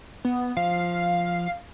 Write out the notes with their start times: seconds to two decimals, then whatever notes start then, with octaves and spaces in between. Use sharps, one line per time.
0.25 B3
0.57 F3 F5